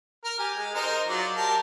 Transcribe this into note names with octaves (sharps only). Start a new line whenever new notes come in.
A#4 F6
G4 G#5
G#3
D#4 A#4 C5
F#3 F4 D5
G4 A#4 A5